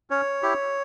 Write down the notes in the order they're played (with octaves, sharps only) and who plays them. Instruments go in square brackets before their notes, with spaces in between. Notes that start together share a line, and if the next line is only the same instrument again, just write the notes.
[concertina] C#4 C#5
E4 G4